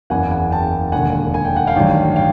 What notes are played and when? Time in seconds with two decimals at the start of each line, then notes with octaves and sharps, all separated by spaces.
0.10 F#1 E2 C#3 F#5 G#5
0.31 F#5 G#5
0.51 G5 A5
0.92 E1 D#2 D3 F#5 G#5
1.34 G#5
1.45 G5
1.56 F#5
1.67 F5 G5
1.74 A1 G2 D#3 F#3
2.16 F5 G5